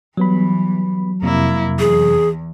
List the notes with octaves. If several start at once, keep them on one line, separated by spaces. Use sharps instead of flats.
E3 F#3 G3 B3 B5
F2 C3 A#3 E4
E2 G#4